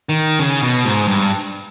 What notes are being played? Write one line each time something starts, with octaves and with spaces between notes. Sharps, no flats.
D#3
C#3
B2
G#2
G2